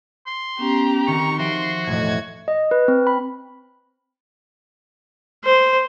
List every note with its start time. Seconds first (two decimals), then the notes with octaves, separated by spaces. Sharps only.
0.27 C6
0.59 B3 C#4 G4 A#5
1.07 D#3 C4 C#6
1.39 F3 F#4 E5 C6 D7
1.87 E1 A2 A3 D#5 G#6
2.48 D#5
2.71 B4
2.88 C4
3.07 B5
5.44 C5